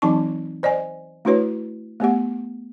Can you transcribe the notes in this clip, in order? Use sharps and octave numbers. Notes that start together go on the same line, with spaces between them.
E3 F#3 C4 D#4 A5 C#6
C5 D5 D#5 G#5
A3 D4 E4 F#4 B4 C#5
A3 B3 G4 F#5